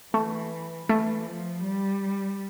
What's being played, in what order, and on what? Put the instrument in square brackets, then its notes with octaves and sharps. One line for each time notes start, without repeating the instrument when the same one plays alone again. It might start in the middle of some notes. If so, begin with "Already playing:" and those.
[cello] E3 [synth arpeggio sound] A3
[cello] E3 [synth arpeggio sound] A3
[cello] F3
G3